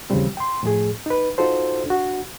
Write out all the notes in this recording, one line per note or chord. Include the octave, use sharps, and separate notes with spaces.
D#2 C#3 E3 F3 G3 C4
G5 C6
A2 F3 A3 G#4
D#4 B4
D#4 F4 F#4 A4 C5
D4 F#4